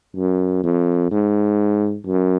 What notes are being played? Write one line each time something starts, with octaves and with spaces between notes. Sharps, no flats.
F#2
F2
G#2
F#2